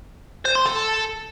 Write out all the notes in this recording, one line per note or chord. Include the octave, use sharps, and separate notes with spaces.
C5
C6
A4